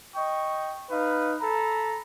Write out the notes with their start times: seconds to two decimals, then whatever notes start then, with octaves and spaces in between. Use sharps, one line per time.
0.16 D#5 G5 C#6
0.90 D#4 B4 F5
1.41 A4 A#5 B5